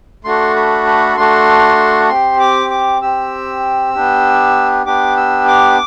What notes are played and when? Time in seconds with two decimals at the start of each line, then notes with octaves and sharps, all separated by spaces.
0.25 A3 D4 F#4 A4 C6
0.56 B5
0.87 B5
1.17 A3 D4 F#4 A4 C6
2.09 C4 G4 C6
2.40 D6
2.70 D6
3.01 C4 G4 E6
3.94 B3 D4 G4
4.86 B3 D4 G4 D6
5.17 E6
5.48 D6